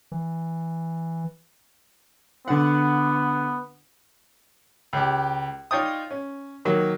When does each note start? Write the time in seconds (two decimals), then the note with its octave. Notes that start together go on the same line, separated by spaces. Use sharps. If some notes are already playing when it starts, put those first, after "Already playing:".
0.12 E3
2.48 D3 B3 F#5
4.93 C#2 G4
5.71 D#4 F4 C#5 D5 G5 D#6
6.11 C#4
6.65 D#3 F#3 A#3